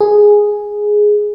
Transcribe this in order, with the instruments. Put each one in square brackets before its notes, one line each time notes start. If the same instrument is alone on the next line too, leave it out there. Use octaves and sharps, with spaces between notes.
[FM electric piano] G#4